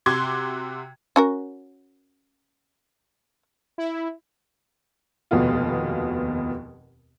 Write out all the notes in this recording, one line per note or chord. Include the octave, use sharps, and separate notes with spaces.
C3 F#4 C6 D6 G#6
C#4 F#4 A#4
E4
F1 D#2 B2 B3 F4